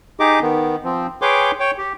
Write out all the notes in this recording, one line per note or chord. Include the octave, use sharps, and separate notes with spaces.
D#4 G4 G#4 D#5 D6
D#3 B3
F3 C4
G#4 B4 C#5 G5 C6 D6
C#5 G5
G4